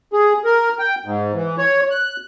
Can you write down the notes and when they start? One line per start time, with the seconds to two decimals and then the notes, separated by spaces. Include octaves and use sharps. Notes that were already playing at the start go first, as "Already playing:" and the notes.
0.13 G#4
0.45 A#4
0.79 G5
1.05 G#2
1.34 E3
1.58 C#5
1.91 F#6